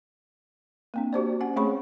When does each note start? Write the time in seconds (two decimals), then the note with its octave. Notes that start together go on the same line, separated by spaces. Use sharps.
0.94 A#3 C4 D4
1.13 F#4 G4 C5 D5
1.41 C#4 F#5
1.56 A3 C4 G#4 C#5 B5 C#6